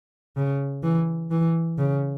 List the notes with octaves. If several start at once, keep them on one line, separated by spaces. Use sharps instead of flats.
C#3
E3
E3
C#3